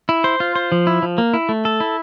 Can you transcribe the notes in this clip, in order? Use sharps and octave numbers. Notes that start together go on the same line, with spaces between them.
E4
C5
F4
C5
F3
E4
F3
A#3
E4
A3
A4
E4